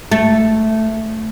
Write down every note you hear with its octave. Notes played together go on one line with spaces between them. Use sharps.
A3